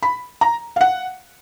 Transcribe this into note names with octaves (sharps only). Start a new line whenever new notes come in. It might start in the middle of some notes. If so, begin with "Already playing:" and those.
B5
A#5
F5
F#5